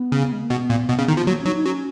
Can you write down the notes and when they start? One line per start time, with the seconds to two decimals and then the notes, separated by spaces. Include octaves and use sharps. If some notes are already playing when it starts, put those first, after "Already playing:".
Already playing: B3
0.12 C#3
0.33 G#3
0.41 A#3
0.50 B2 B3
0.70 A#2
0.89 B2
0.99 C#3
1.08 D#3
1.17 F3
1.23 B3
1.27 F#3 A#3
1.42 C#4
1.46 F#3 D#4
1.56 D#4
1.65 F#3 C#4